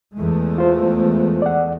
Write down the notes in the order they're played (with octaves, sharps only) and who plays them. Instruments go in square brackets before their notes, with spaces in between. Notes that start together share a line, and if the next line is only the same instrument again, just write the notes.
[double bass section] E2 G#3 A3
[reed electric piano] F4 C5
D5 F#5